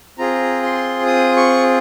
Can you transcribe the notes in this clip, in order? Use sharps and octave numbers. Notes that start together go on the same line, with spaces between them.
C4 F4 G#4 A#5
C6
D#6
C#6